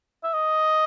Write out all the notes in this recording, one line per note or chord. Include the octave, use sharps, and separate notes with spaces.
E5
D#5